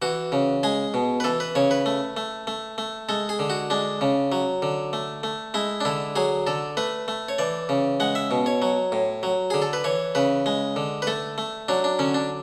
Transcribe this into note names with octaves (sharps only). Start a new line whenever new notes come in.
E3 F#4
C#3
G#3 G#4
B2
B4
E3 A4
B4
C#3 C#5
B4
A3
A3
A3
A3
G#3 A4
G#4
D3
F#4
G#3 D4
C#3
F#3
D3
A3
A3
G#3 E4
D4
D3 E4
F#3 G#4
D3 A4
A3 B4
A3
C#5
E3 D5
C#3
G#3 F#5
E5
B2
C#5
F#3
A2
F#3
D3 G#4
A4
B4
E3 C#5
C#3 B4
G#3
D3
B4
A3 A4
A3
F#3 D4
D4
D3 C#4
D4